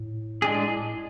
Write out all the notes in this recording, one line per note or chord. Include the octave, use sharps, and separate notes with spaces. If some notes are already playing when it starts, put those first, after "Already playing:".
Already playing: A2
G#3 D4 G#4
A2